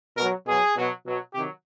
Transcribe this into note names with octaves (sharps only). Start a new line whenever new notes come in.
B2 F#3 A#4
B2 F#3 G#4
B2 F#3
B2 F#3
C3 D#3 F#3 G4